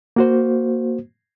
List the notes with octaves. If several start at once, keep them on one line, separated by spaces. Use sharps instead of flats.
A#3 F#4 C5